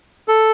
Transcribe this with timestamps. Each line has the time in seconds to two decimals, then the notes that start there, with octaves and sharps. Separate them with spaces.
0.28 A4